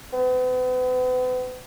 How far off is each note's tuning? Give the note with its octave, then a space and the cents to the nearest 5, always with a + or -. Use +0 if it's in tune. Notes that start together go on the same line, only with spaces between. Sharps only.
B3 +40